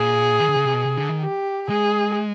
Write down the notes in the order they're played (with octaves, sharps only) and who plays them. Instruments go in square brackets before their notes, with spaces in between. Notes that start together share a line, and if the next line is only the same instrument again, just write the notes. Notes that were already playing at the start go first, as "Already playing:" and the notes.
Already playing: [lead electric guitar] A#2 [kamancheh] G#4
[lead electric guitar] D#3
D3
C#3
C3
B2
C3
D3
D#3
[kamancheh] G4
[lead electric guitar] G#3 [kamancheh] G#4